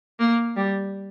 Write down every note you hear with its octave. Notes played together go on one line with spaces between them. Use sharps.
A#3
G3